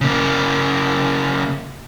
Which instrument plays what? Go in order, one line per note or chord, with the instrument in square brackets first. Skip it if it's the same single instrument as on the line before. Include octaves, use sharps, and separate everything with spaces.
[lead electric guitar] C#3 A#3